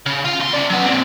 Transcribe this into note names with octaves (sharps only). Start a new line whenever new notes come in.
C#3
F4
E2 C6
C#4 D5
F#3 B3
A#2 C4